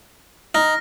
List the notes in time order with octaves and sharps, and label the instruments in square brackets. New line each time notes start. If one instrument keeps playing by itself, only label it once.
[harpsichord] D#4 [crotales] F6 A#6